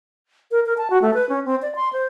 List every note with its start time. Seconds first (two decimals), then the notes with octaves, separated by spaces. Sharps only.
0.51 A#4
0.66 A#4
0.78 A5
0.90 F#4
1.02 A3
1.14 B4
1.29 C#4
1.45 C4
1.62 D5
1.75 C6
1.93 C5